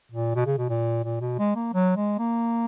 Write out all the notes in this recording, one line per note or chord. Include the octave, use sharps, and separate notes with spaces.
A#2
B2
C#3
B2
A#2
A#2
B2
G#3
A#3
F#3
G#3
A#3